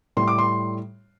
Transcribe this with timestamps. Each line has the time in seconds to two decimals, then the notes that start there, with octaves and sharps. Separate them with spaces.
0.17 A2 G3 C6
0.28 D6
0.38 C6